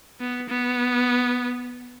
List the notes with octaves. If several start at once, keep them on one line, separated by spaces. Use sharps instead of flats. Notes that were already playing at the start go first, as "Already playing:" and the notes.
B3
B3